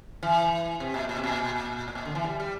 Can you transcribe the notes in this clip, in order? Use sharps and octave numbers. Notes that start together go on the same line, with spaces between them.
E3
C3
A#2
A#2
C3
A#2
A2
A#2
D3
E3
G3
G3